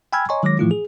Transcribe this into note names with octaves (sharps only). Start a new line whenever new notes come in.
G5 G#5 B5 E6 F6 G#6
C#5 D#5 G#5 A#5 C6 C#6
D#3 F#3 G#3 C#5 D6 A#6
A2 E3 F3 A3 E4 F4
G#4